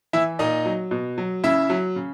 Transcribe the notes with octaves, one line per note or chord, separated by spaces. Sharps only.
E3 E4 E5
A#2 D#4 D#5
F#3
B2
F#3
C#3 E4 E5
F#3
C#3